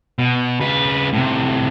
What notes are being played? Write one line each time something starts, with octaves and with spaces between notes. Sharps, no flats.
B2
C#3 B4
A2 C3